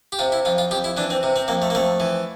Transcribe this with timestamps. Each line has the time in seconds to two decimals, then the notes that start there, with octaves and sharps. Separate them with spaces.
0.12 G4
0.19 C3 F4
0.32 E4
0.45 F2 F4
0.58 F4
0.71 F2 G4
0.84 E4
0.97 E3 D4
1.10 C4
1.23 C3
1.36 C4
1.48 F2 A#3
1.62 A3
1.70 A#3
1.75 F2 A3
2.00 E3